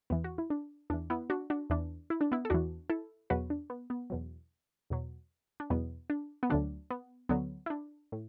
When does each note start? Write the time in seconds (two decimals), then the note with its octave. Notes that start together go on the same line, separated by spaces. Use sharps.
0.10 E2 E3 B3
0.24 F#4
0.38 E4
0.50 D4
0.90 E2 E3 D4
1.10 B3 E4
1.30 D4 F#4
1.50 D4 F#4
1.70 E2 E3 D4
2.10 E4
2.21 D4
2.32 B3 E4
2.45 A4
2.50 E2 E3 D4 F#4
2.90 E4 A4
3.30 E2 B2 F#3 F#4 B4
3.50 D4
3.70 B3
3.90 B3
4.10 E2 B2 F#3
4.90 E2 B2 F#3
5.60 D4
5.70 E2 B2 F#3 B3
6.10 D4
6.43 B3
6.50 D2 D3 F#3 D4
6.90 B3
7.29 D2 D3 F#3 B3
7.66 E4
7.70 D4
8.12 A2